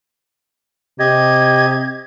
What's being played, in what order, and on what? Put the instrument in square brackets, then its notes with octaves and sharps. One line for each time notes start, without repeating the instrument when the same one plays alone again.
[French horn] C3 [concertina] G4 D#5 [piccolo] G#6